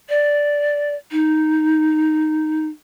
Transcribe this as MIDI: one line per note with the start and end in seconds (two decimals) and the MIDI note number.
0.09 0.94 74
1.11 2.66 63